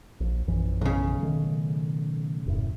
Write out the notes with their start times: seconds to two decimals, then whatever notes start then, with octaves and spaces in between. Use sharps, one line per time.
0.20 A#1
0.47 A#1 F#2 E3
0.81 B1 C#3
1.22 D#3 A3
2.46 D#1 F#2 A2